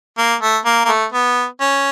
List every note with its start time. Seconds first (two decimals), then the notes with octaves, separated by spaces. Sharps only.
0.18 A#3
0.41 A3
0.65 A#3
0.85 A#3
0.88 A3
1.12 B3
1.61 C#4